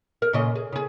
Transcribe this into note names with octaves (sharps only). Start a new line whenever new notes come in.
A#4
A#2 C#3 D#5
G#4
C#3 G#4